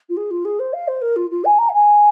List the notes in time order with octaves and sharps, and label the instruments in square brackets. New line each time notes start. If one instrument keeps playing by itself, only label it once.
[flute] F4
G#4
F4
G#4
C5
F5
C5
A#4
F4
F4
G#5
A#5
F5
G#5